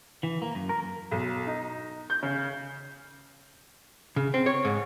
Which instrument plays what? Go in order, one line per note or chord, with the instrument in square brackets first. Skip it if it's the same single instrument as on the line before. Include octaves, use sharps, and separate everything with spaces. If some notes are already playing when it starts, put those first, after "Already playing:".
[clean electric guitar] E3
A#3
F#2
A#4
[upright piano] B1
D#4
G6
C#3
[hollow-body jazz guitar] C#3
C4
C#5
G#2